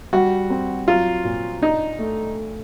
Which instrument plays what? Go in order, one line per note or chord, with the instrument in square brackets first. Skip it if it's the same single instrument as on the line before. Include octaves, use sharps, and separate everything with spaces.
[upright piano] G3 [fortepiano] F#4
[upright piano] C4
[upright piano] F#3 [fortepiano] F4
[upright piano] A#2
[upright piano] D4 [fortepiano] D#4
[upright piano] A3